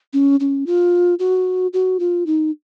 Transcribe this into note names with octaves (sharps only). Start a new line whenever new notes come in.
C#4
C#4
F4
F#4
F#4
F4
D#4